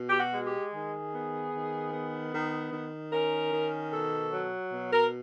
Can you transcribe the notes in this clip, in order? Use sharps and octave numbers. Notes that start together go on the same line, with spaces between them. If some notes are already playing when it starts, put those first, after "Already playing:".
Already playing: B2
G4
F#4
G#3
G4
D#3 G#4
B3
D#3
B3
D#3
D#3
C#4 A#4
D#3
B2 A4
F#3
B2
A#4